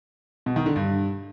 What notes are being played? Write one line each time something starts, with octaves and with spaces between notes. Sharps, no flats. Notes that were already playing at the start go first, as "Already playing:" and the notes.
B2
D#3
D3
G2